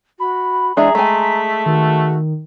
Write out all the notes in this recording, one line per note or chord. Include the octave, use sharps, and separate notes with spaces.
F#4 B5
E3 G#3 D4 G#4 E5 A#5
G#3 A3 G#5 B6
D#3 F#4